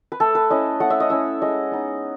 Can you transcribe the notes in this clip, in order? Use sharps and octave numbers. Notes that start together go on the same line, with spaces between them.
B4
A3 A4
B4
C#4 E4 D#5
A3 F#5
E5
D#5
C#4 E4 E5
G#3 D#5
B3 D#4